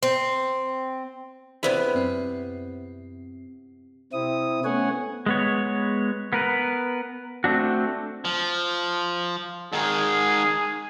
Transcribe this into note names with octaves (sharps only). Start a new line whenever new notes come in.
C4
C3 B3 E4 G#4 C5 D5
F#2 C4
C3 C4 E4 D#6
A3 B3 C#4 C#5 F#5 G#5
G#3 B3 C#5
B3 A#4 B4
A3 C4 D4 F#4
F3
G#2 D#3 G#4